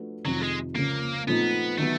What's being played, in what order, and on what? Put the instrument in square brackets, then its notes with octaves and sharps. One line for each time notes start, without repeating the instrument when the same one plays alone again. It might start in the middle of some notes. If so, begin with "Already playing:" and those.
Already playing: [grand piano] F3 A3 D4 F#4 B4
[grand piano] F2 C3 D#3 [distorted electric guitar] F#3
[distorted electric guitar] G#3
[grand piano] C#2 C#3 F3 [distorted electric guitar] A#3
[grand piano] A#2 F3 A3 C4 D#4 [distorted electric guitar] B3
[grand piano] D#3 F#3 B3 [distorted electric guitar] A3